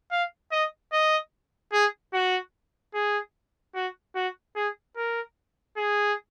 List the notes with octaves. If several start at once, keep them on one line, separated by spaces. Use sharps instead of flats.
F5
D#5
D#5
G#4
F#4
G#4
F#4
F#4
G#4
A#4
G#4